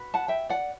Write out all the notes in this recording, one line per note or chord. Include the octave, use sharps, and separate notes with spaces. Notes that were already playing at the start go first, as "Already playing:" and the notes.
Already playing: F#4 B4
F#5 A5
E5 G5
D5 F#5